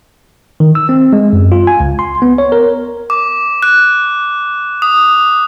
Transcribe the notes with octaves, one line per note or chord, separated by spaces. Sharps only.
D#3
E6
C4
G#3
F#2
F4
G#5
C#2
C6
B3
C#5
A#4
D6
F#6
D#6